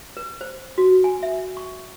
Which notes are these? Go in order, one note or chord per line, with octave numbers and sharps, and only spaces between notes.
B4
C5
F#4
G#5
E5
C#6